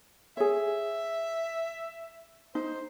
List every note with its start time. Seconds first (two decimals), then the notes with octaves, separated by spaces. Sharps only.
0.37 G#4 C#5 E5
2.55 D#4 C5